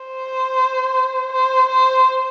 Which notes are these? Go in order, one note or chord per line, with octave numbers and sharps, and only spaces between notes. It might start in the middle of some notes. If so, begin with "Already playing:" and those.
Already playing: C5
C5
C5